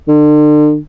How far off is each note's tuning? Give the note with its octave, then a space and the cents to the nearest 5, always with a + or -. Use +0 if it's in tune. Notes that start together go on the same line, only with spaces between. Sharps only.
D3 +40